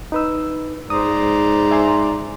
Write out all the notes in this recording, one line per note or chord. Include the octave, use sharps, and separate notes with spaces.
D#4 B4 E6
G#2 C5 D5 A#5 D#6
E5 G#5 C6